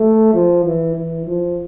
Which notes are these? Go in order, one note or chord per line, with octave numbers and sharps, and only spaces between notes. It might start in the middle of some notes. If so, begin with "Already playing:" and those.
Already playing: A3
F3
E3
E3
F3